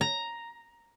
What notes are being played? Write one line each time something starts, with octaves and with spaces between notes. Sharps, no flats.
A#5